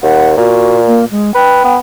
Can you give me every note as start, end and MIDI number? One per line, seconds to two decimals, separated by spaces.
0.03 0.34 39
0.03 0.26 78
0.37 1.05 46
0.37 0.79 66
0.87 1.05 58
1.11 1.34 56
1.35 1.61 71
1.35 1.71 79
1.64 1.78 59